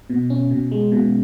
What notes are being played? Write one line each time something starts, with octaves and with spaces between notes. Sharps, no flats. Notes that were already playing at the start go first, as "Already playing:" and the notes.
B2
C#4
B2
G#3
B2